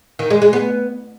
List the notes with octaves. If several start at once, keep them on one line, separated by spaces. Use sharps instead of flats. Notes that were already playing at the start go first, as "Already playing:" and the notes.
D#3
G#3
G#3
B3